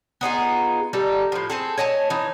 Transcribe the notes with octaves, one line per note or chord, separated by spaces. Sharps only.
B3 D#4 F4 G#4
G3 D#4 A4
A2 F3
C4 G#4 A4
C#5 D#5 G#5 A5
E3 D#4